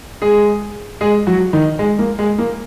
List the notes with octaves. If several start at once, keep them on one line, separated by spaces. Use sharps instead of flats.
G#3 G#4
G#3 G#4
F#3 F#4
D#3 D#4
G#3
A#3
G#3
A#3